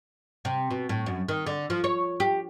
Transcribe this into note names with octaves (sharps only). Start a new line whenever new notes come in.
C3
B2
A2
F#2
D#3
D3
F3
C#5
G4